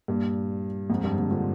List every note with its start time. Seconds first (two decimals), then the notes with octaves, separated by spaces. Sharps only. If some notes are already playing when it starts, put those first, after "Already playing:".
0.08 G2 A#2
0.90 F2 G#2
1.04 G2
1.16 A#2 D3
1.30 D3 F3